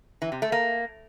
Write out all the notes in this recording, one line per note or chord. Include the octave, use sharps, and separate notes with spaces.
E3
C3
A3
A#3